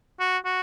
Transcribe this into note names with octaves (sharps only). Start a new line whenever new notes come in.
F#4
F#4